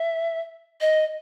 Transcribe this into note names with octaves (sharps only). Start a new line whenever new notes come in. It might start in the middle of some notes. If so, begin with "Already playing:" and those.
Already playing: E5
D#5